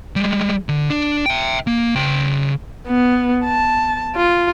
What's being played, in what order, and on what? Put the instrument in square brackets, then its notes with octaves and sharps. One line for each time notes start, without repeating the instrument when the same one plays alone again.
[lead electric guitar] G3 G#3
D3
D4
E5 G5
A#3
C#3 G5
[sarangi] B3
A5
F4